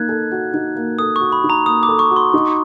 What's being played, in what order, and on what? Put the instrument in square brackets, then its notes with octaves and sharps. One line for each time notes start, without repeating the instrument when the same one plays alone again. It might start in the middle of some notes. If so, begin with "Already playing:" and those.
Already playing: [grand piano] A#3 D#4 [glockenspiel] F#6 G#6
[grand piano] A4
F#4
D#4
A#3
[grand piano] A4 [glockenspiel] D#6
[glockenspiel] C#6
[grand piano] F#4
[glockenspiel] B5
[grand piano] D#4
[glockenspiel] A#5
[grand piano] A#3 [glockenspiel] D#6
[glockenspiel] D6
[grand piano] A4
[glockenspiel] C#6
[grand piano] F#4
[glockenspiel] C6
[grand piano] D#4